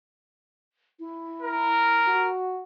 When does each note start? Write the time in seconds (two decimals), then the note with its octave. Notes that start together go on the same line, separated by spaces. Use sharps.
1.00 E4
1.42 A#4
2.07 F#4